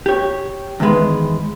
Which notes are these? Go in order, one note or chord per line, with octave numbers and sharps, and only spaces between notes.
G4 C#5
E2 G#2 D#3 G#3 B4